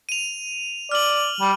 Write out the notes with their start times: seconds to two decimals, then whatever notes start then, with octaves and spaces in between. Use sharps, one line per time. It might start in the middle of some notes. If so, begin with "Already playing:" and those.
0.09 D#7 F7
0.92 D5 F6 F#7
1.41 G3